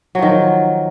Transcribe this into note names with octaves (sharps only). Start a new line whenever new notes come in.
D#3 F3 F#3